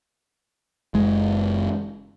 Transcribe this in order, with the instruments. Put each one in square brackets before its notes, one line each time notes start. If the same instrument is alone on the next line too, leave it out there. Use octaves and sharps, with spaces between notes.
[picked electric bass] F#1 G#3